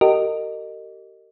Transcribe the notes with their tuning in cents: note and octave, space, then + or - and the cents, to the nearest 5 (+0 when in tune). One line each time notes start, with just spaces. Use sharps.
G4 -30 A#4 -35 D#5 -10